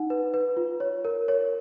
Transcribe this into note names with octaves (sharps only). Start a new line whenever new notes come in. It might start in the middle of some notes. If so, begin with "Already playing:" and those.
Already playing: D#4 F#5
B4
B4
F4
C#5
A#4
C#5